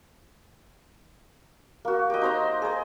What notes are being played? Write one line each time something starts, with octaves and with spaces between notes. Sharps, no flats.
A#3 F#4
G4 D#5
D#4 C5 A#5
G#4 C5